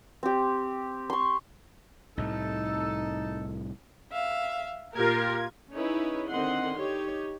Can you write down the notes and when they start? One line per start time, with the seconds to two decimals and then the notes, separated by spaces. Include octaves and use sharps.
0.23 C4 G4
1.10 C6 C#6
2.18 C2 A2 A3 D#4 A4
4.12 E5 F5
4.95 A#2 F4 G4 A#4 G#6
5.74 C#4 D#4 E4 G#4 B4 C#5
6.29 D3 D#3 C4 D#5 F#5 C6
6.77 D#4 G4 C#5